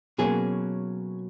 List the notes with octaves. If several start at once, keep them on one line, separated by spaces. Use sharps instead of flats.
B2 F#3 A#3 C#4 G#4